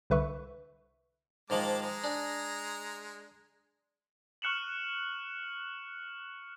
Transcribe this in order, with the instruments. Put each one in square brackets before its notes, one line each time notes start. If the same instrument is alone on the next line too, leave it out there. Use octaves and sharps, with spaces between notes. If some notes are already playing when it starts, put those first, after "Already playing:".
[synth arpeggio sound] C2 D3 B4 E5 C#6
[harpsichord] G#2 D#3 F3 [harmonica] G#3 A5 D6
[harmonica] G#3 A#5
[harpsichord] D4 G#4
[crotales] C#6 F6 F#6 C#7 E7 F#7